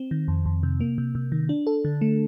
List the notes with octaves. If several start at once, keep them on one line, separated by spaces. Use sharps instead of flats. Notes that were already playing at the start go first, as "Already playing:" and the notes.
Already playing: C4
D#3
F2
F2
C3
A#3
C3
C3
D#3
D4
A4
D3
A3